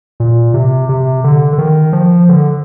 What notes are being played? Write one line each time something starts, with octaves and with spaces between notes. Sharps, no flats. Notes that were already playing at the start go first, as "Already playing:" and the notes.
A#2
C3
C3
D3
D3
D#3
F3
D3